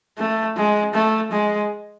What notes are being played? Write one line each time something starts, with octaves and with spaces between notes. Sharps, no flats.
A3
G#3
A3
G#3